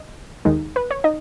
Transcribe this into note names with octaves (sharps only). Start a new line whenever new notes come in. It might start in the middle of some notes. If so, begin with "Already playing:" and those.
Already playing: D#5
D#2 D#3 G#3 D#4
B4
C#5
D#4 D#5